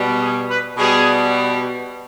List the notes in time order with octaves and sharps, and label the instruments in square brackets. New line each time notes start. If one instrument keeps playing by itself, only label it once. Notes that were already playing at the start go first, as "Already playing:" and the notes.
Already playing: [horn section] B2 G3
G#4
B4
B2 G3 G#4